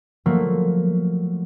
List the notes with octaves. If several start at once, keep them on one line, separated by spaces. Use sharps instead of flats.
F3 F#3 A3 A#3